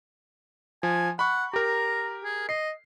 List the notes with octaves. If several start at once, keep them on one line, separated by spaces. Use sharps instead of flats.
F3 G#5
F#5 B5 C#6
G4 A#4 A#5
G#4
D#5 C7